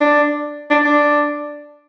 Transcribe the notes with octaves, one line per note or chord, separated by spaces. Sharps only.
D4
D4
D4